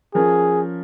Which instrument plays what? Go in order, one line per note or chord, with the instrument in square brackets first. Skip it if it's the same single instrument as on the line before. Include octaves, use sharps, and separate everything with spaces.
[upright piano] F3 C#4 A#4 [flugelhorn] G#4